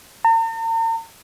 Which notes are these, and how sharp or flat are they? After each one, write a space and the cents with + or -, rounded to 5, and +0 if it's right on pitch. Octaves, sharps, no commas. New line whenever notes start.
A#5 -45